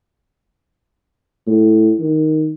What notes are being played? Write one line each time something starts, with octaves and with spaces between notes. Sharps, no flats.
A2
D#3